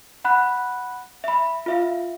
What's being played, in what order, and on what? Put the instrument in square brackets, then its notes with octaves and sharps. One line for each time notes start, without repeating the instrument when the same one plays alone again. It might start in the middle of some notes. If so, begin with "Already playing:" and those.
[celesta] F#5 B5 F#6
E5 B5
F4 E5 F5